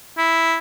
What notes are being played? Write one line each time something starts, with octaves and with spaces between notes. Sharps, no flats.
E4